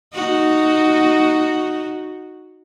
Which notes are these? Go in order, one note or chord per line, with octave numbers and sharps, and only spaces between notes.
D#4 F#4